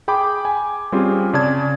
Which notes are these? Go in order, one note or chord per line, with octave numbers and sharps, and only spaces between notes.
G#4 G5 B5 D6
G#5
G3 C4 C#4 F4 G4 G#4
C#3 D5 A5 G#6